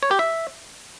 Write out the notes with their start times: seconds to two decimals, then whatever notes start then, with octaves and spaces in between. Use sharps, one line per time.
0.03 C#5
0.11 G4
0.19 E5